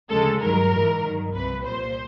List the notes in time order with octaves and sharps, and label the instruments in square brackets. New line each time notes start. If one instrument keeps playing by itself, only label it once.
[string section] D2 C#3 F3 G#3 A4
G2 D#3 F#3 A#4
G#2 E3 G#3
G2 D#3 F#3
C2 C3 F3 B4
C2 A#2 G3 C5